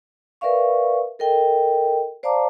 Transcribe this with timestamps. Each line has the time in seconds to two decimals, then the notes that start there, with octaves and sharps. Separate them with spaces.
0.41 A#4 B4 D5 E5 F5 C#6
1.19 A4 A#4 D#5 G5
2.23 C5 D5 F5 A5 A#5 D6